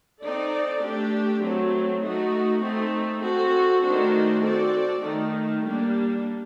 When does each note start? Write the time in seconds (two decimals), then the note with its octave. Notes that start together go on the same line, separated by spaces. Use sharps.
0.21 C4 D#4 A4 D5
0.81 A3 D4 G4
1.42 F#3 A3 C4
2.03 A3 D#4 F#4
2.63 A3 C4 D#4
3.22 C4 F#4 A4
3.84 D#3 A3 D4 F#4 C5
4.43 C4 F#4 A4 D5
5.04 D#3 A3 D#4
5.65 G3 A#3 D4